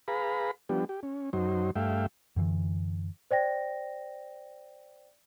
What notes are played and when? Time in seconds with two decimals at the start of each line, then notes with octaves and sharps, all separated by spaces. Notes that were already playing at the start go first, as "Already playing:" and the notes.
0.08 G#4 B4 F5 A#5 B5
0.69 F3 G3 B3 D4 G4
0.89 G4
1.03 C#4
1.33 F#2 F#3 D#4 C5
1.76 G2 A3 E5 F5 G5
2.36 F#2 D3 E3
3.31 C5 D5 G5 A#6